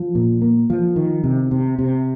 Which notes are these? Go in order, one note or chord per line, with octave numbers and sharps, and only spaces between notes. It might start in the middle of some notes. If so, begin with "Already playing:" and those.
Already playing: F3
A#2
A#3
F3
D#3
C3
C3
C3